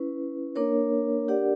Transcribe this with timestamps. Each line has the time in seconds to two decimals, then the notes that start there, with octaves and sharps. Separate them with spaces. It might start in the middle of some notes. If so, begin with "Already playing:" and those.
Already playing: C#4 E4 B4
0.56 A#3 D4 A#4 C#5
1.28 D4 G4 A#4 D5 F#5